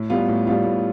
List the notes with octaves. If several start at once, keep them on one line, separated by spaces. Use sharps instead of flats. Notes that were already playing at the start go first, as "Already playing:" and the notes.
Already playing: A2
G3 B3 F4
A2
G3 B3 F4
A2